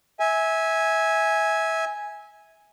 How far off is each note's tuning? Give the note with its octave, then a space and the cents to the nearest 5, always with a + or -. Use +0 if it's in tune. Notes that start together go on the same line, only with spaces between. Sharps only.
E5 -20 G#5 +0